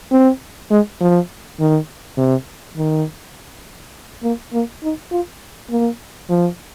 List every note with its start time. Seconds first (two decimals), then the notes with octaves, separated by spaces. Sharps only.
0.12 C4
0.71 G#3
1.01 F3
1.60 D#3
2.17 C3
2.77 D#3
4.23 A#3
4.53 A#3
4.83 D#4
5.11 F4
5.70 A#3
6.29 F3